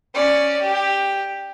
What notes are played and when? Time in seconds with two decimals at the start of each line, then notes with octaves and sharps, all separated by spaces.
0.14 C#4 D5
0.61 G4